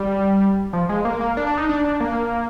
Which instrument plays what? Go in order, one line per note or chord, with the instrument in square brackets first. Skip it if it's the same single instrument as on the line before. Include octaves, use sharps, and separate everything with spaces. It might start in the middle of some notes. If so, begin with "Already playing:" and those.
Already playing: [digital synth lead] G3
F3
G#3
A#3
A#3
D4
D4
D#4
D4
D4
A#3